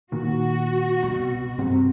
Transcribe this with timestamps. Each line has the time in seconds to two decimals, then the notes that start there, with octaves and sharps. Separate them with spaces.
0.12 A#2 D#3 F#4
1.02 C2 B2
1.58 G2 C3 C4